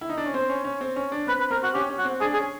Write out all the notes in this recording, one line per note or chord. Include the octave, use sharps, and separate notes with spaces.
E4
D#4
D4
C#4
C4 C5
C#4
C#4
C4
C#4
D4
C4 B4
B4
C4 A#4
F#4
C#4 G4
C#4
F#4
C4
D4 G#4
G#4
C#4